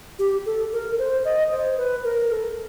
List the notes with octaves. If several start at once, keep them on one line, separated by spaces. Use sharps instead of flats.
G4
A4
A#4
C5
D#5
C5
B4
A#4
A4